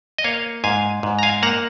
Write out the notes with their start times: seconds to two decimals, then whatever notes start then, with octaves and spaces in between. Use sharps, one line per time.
0.18 D#5
0.24 A#3 C#5 F5
0.64 G#2 F5 G#5
1.03 G#2
1.19 A#5
1.23 F5 G#5
1.43 A#3 F#5 A#5